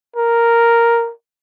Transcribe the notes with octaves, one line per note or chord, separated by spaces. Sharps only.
A#4